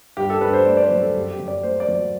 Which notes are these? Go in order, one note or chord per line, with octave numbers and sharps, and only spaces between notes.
G2 G4
A4
G2 B4
C5
A3 D5
D5
C5
F#3
A4
F#2 G4
G4
F#2
D5
A3 C5
D5
F#3